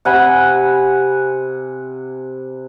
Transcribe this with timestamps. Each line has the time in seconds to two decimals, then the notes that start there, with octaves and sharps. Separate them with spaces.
0.05 C3 F#5 G#5 B5